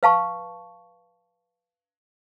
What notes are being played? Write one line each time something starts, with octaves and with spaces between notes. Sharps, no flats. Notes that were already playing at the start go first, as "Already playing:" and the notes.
B4 F5 A5 C#6